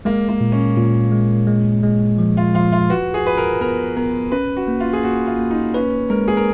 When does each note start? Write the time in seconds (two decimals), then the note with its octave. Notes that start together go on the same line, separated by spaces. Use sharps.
0.05 G#3 A#3
0.29 A#3
0.41 A#2
0.52 C#4
0.77 A#2
1.12 G#3
1.47 G#3
1.83 G#3
2.18 F3
2.37 F4
2.55 F3 F4
2.72 F4
2.90 F#4 B4
3.14 G#4
3.26 F4 B4
3.38 A#4
3.61 B3 A#4
3.97 B3 A#4
4.32 C#4 B4
4.56 F#4
4.68 A#3
4.80 F4
4.93 G#4
5.03 A#3 F#4
5.27 F4
5.39 A#3
5.51 D#4
5.74 C#4 B4
6.10 G#3 A#4
6.28 G#4
6.37 A#4